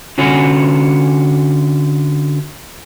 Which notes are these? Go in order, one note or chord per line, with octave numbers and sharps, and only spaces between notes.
D3 C#4 F#4 C#5 G#5